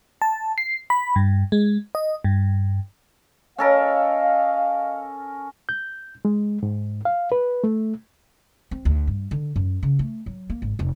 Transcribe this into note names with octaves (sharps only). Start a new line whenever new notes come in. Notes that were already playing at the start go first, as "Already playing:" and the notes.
A5
C7
B5
G2
G#3
D#5
G2
C#4 A4 A#4 D#5 F5
G6
G#3
G#2
F5
B4
A3
C4
D2
G2
D3
F#2
C#3
A3
F#3
A#3
G#1
F1